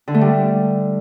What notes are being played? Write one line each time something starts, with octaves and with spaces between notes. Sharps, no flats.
D3
A3
G3